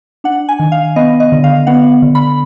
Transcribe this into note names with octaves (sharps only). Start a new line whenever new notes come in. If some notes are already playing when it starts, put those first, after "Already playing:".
D4 F#5
G#5
D#3
F5
B3 D#5
D#5
D3
F5
B3 F#5
D3
B5